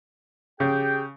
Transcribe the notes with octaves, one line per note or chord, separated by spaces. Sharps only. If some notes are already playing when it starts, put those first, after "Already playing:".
C#3 G4 G#4 G5